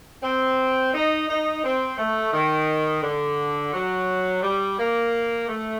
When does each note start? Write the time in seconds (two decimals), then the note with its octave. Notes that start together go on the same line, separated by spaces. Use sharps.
0.23 C4
0.94 D#4
1.29 D#4
1.63 C4
1.98 A3
2.33 D#3
3.03 D3
3.73 F#3
4.43 G3
4.78 A#3
5.48 A3